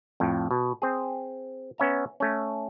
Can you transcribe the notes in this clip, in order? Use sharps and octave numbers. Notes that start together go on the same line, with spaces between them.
F2 A2
B2
C4 G#4
B3 C#4 E5 A#5
A3 C#4